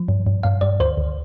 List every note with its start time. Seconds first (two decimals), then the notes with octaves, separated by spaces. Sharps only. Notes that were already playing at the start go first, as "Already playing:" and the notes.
Already playing: F3
0.08 G2
0.27 G2
0.43 G2 F5
0.61 G2 D5
0.80 D2 C5
0.97 D2